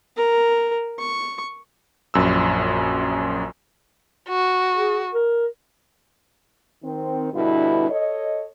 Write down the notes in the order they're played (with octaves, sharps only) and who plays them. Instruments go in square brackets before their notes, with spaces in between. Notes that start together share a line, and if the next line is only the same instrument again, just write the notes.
[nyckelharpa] A#4
C#6
[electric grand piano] A#1 F#2 E6
[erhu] F#4
[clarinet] G#4
A#4
[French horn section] D#3 C4
G2 B2 D3 E4
A4 C#5 D#5